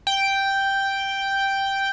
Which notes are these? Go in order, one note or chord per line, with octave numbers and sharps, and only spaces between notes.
G5